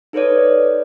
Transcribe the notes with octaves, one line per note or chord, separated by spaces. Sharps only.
D#4 A4 B4 C#5 D5